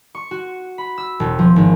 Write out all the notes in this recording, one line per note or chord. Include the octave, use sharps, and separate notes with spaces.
C#6
F#4
B5
E6
E1
F3
G#1